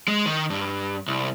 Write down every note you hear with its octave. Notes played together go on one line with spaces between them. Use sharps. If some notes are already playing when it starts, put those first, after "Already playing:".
G#3
D#3
G2
C2